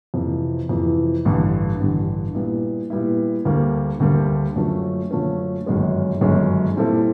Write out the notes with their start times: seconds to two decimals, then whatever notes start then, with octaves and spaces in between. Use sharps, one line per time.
0.14 F2 C3 E3
0.69 F2 C3 E3
1.25 A1 G2 D3
1.79 A1 G2 D3
2.35 A#2 G3 B3 E4
2.90 A#2 G3 B3 E4
3.45 D2 D3 G3 A#3
4.00 D2 D3 G3 A#3
4.56 F#2 D3 F3 A3 C#4
5.11 F#2 D3 F3 A3 C#4
5.66 G1 F#2 D#3 G#3 C#4
6.21 G1 F#2 D#3 G#3 C#4
6.77 A#2 G3 C4 E4 A4